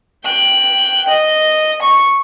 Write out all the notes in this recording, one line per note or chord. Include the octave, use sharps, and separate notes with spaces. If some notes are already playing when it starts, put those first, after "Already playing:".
G5 F#6
D#5
C#6